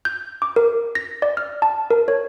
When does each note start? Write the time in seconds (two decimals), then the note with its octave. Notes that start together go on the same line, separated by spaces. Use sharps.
0.05 G6
0.42 D6
0.56 A#4
0.95 A#6
1.22 D5
1.37 F6
1.62 A5
1.91 A#4
2.08 C#5